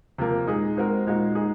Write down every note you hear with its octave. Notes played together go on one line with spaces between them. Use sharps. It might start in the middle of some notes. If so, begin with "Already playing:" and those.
C3 F3 A#3
A#2 G#3 D#4 G#4
G#3 C4 F#4 A#4
A#2 G#3 D#4 F#4
G#3 D#4 G#4